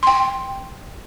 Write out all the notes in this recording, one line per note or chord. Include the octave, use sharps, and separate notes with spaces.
G5 C6